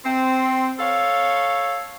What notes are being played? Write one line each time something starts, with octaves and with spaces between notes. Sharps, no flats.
C4
A4 C#5 F5